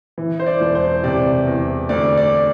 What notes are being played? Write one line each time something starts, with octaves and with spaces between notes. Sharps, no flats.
E3
C5
D5
E1
C5
C3 D5
E2
D2 D5
D5